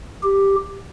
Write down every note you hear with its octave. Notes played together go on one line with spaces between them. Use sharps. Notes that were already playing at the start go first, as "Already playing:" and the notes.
G4